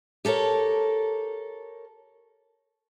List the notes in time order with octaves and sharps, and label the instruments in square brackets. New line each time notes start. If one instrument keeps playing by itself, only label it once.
[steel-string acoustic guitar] G4 A4 A#4 C#5